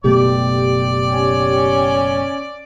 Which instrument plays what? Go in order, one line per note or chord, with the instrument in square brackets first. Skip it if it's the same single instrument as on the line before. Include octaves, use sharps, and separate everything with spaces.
[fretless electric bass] F#1 B2 A3 [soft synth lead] G4 [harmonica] D5
[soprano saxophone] C#4